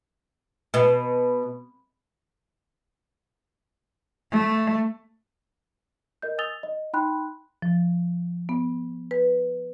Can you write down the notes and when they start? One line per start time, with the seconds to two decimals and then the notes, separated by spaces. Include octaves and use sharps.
0.74 B2
4.32 A3
6.22 A#4 D#5 G6
6.38 G#5 D#6 E6 A6 F7 G7
6.63 D#5
6.93 D#4 G5 B5 C6 F#6
7.62 F3
8.49 B3
9.11 B4